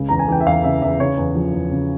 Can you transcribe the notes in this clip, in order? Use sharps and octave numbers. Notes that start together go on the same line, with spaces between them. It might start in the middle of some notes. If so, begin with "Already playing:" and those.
Already playing: C#2 C#3
E2 A#5
G#5
E3 G5
E5
E2 F5
C#3 E5
E2 E5
C#3 C#5
E2
F3
E2
C#3